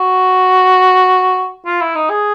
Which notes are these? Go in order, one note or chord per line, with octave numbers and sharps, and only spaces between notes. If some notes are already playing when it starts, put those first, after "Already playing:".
Already playing: F#4
F4
E4
D#4
G#4